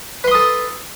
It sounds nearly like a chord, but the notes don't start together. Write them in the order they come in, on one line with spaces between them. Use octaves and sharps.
B4 C6 D#6 A4